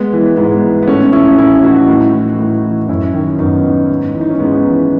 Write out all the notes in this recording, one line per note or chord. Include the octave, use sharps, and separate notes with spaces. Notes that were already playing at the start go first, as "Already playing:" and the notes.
Already playing: G#3 B3
E3
G#2 G#3 B3
E3
B3
A2 A3 C#4
E3 C#4 E4
A2 C#4 E4
E3 D#4 F#4
A2
E3
A2
E3
F#2 C#4 E4
D#3
F#2 B3 D#4
D#3
G#2
E3
D#4
C#4
G#2 G#3 B3
E3